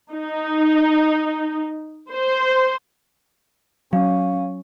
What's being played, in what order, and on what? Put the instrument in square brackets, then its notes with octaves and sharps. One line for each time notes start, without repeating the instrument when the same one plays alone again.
[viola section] D#4
C5
[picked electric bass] F#3 [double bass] C#4 [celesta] F5